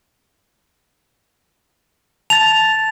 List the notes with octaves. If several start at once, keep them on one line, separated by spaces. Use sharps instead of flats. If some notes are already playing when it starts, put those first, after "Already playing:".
A5 A6 F7